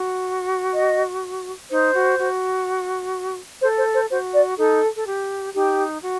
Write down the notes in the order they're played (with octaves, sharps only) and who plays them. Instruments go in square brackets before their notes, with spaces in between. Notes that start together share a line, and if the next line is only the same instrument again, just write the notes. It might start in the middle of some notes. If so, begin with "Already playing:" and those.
Already playing: [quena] F#4
[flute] D#5
[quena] D#4 [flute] C5
[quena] F#4
F#4
[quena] A4 [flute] C5
[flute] C5
C5
[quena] F#4 [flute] C5
[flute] D5
[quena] D#4 [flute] A4
[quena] A4
G4
[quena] D#4 [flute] G4
[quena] F#4